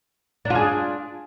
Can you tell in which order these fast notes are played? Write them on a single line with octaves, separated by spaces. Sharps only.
D4 F4 G#4